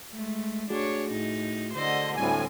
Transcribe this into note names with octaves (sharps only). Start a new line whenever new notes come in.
G#3 A3
A3 D4 F#4 G#4 C#5
A2 D#4
D3 C5 D#5
D2 A2 G3 C4 G#5